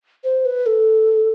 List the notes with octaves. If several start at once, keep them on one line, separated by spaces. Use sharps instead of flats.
C5
B4
A4